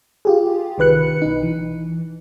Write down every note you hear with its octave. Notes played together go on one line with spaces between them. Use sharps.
F4 G4 G#4
C2 D#3 B4 F#6 C#7
B1 D#4
E3